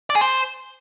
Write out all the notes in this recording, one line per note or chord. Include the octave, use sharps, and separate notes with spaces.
D5
G#4
C5